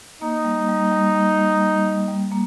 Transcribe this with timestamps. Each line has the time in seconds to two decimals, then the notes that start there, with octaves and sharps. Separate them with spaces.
0.22 A#3 D#4
0.45 G3
0.68 G3
0.91 G3
1.15 G3
1.38 G3
1.61 G3
1.86 G3
2.08 G3
2.31 A#3